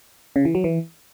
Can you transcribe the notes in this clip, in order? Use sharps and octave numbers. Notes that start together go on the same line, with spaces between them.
C#3
E3
F#3
E3